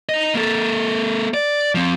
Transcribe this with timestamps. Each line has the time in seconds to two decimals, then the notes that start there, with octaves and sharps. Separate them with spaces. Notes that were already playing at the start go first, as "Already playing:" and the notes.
0.09 D#4 D#5
0.35 A#3 A4
1.34 D5
1.75 F3 C4